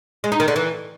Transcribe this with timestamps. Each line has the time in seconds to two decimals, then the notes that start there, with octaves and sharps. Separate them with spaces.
0.24 G#3
0.32 D#4
0.40 D#3
0.48 D3
0.56 E3